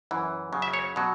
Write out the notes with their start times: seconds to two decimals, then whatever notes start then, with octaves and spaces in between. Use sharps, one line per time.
0.11 F#2 E3
0.53 F#2 C#3 F#3
0.62 E5
0.73 C#5
0.96 B2 F#3